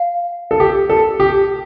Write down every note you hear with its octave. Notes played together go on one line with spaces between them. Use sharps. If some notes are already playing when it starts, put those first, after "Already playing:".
Already playing: F5
A4
G4
A4
G4